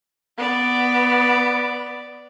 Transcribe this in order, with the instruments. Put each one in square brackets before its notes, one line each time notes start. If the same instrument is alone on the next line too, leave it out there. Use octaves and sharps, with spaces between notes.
[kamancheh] B3 D5